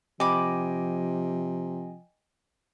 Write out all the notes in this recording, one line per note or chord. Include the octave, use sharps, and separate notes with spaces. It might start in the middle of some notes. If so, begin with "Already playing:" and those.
C3 F3 D#5 G5 G#5 B5 D6